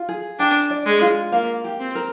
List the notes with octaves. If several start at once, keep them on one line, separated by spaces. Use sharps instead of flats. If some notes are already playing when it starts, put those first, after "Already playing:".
Already playing: F4
G#4
D4 G5
D5
G#3
F4
A#3 F5
G4
C4
A#4